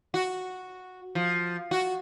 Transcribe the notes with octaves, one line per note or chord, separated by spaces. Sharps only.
F#4
F3
F#4